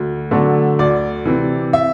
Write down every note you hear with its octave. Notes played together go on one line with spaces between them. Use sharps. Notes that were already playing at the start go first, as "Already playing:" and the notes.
Already playing: D2
D3 F#3 A3 D4
D2 D5
C3 E3
E5